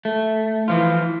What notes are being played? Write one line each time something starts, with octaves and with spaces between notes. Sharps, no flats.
A3
E3 F3 F4